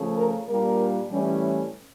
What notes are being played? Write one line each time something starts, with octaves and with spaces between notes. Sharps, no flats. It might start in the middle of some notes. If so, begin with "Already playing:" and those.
Already playing: C#3 F3 A3
A#4
A#2 G3 A#3 D4 A#4
A2 E3 G3 C#4